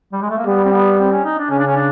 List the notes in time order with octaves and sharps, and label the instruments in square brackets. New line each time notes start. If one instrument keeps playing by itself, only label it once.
[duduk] G3
G#3
A3
A#3
[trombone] G3 [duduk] B3
[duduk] C4
B3
C4
C#4
D#4
D4
[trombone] C#3 [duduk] C#4
[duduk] D4
C#4
D4